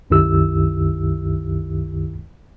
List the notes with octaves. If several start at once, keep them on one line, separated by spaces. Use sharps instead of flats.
C2 F#2 D#3 E4 G4 E6